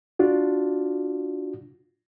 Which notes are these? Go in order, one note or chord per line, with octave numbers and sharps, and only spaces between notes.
D4 F4 F#4